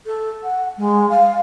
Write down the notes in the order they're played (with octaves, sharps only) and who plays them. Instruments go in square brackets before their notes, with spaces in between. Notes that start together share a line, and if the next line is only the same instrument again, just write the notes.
[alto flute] A4
F#5
G#3
F5